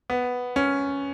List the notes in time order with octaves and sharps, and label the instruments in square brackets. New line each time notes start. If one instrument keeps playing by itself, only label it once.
[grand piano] B3
C#4